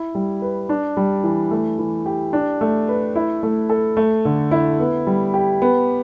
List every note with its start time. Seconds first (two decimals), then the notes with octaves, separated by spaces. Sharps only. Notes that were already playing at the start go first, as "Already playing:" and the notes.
Already playing: E4
0.15 G3
0.42 B4
0.69 D4
0.97 G3
1.24 E3
1.51 A3
1.79 E3
2.06 G4
2.33 D4
2.61 A3
2.89 B4
3.16 E4
3.43 A3
3.70 A4
3.97 A3
4.25 D3
4.51 E4
4.80 B3
5.07 G3
5.34 G4
5.62 B3